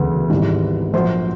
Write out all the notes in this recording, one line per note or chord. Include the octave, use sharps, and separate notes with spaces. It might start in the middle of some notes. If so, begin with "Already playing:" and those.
Already playing: E1 D2 C#3 F#3 B4
G#1 G#2 E3 G3
A#1 A#2 F#3 C5